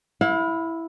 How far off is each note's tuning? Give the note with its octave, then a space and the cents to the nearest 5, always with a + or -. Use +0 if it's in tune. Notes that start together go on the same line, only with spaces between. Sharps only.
E4 +0 F5 +40